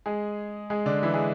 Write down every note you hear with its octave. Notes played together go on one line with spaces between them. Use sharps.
G#3 G#4
G#3 G#4
D3 D4
E3 E4
G#3 G#4